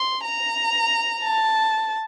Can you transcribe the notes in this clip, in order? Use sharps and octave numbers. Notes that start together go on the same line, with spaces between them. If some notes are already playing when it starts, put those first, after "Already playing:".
Already playing: C6
A#5
A5